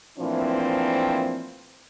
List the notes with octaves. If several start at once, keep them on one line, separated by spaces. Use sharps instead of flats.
A2 E3 F3 A#3 C4 D4